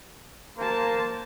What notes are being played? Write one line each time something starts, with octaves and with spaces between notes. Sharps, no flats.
A#3 C5 A5